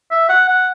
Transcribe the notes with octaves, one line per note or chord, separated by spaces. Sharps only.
E5
F#5
F#5